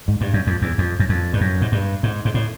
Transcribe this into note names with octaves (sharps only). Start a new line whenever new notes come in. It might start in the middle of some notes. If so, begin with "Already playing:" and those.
G#2
G2
F#2
F2
E2
F2
F#2
F2
G2
F#2
G#2
G2
G#2
G#2
A2